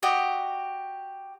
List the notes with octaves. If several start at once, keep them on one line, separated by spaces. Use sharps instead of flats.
F#4 G4 D#5